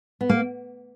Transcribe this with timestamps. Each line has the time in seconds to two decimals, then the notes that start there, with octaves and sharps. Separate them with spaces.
0.21 B3
0.30 A#3